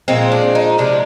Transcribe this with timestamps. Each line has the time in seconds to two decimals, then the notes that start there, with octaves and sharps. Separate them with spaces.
0.08 A#2 F3 G#3 C4
0.32 D4
0.55 D#4
0.78 C3 F3 G#3 D4